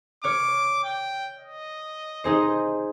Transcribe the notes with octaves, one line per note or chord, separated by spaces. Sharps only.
C#5 D6 F6
G5
D#5
D#4 G#4 C5